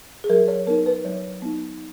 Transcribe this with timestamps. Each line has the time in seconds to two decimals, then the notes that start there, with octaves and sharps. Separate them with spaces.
0.24 G#4
0.30 F#3 A#4
0.48 C#5
0.67 B3 D#4 A#4
0.86 B4
1.05 F#3 C#5
1.42 B3 D#4